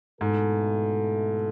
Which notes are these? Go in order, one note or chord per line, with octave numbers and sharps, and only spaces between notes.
G#2 B2 A3 E4 A4